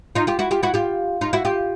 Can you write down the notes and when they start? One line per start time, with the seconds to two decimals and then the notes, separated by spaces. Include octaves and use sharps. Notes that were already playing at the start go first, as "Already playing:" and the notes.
0.15 D#4 F4
0.27 F4 G4
0.39 E4 F#4
0.51 F4 G4
0.63 E4 F#4
0.74 F4 G4
1.21 D#4 F4
1.33 E4 F#4
1.45 F4 G4